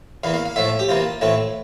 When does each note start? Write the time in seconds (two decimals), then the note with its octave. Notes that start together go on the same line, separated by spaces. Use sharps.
0.24 E2 E3 A#3 F5
0.34 F5
0.45 F5
0.56 A2 F3 A3 E5
0.79 G4
0.89 C3 E3 A#3 F4
1.21 A2 E3 A3 C4